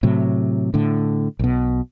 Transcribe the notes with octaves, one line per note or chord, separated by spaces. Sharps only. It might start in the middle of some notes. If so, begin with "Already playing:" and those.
A2 C3 F#3
A2 D3
B1 B2